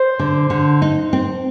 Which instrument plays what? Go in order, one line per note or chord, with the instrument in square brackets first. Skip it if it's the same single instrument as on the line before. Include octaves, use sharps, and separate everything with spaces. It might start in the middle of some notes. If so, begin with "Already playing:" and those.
Already playing: [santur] C5
[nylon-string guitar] D3
D3
D#4
C4